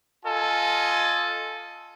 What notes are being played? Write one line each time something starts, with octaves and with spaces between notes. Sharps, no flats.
F4 A4 D#5 G#5